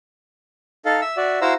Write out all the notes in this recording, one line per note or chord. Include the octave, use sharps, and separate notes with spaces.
D#4 A4 F5
E5 E6
F#4 D5 E5
E4 F#4 C5 F5 A#5 E6